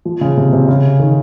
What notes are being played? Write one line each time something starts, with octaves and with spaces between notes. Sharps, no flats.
F3
C#3
C3
C3
C#3
D#3